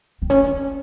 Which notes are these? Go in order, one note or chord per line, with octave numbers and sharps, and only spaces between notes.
C4
C#4